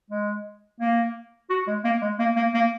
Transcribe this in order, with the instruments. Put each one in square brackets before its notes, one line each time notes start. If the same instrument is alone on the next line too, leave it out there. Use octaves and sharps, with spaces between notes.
[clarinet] G#3
A#3
F#4
G#3
A#3
G#3
A#3
A#3
A#3